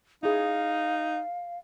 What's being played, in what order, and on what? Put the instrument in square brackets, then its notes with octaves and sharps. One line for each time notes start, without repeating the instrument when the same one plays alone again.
[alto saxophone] D#4 [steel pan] E4 G#4 [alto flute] F5